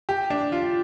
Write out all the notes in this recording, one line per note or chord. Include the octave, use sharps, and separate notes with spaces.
G4
D4
F4